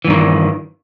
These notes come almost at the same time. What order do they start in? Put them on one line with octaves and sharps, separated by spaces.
E3 G2 D#3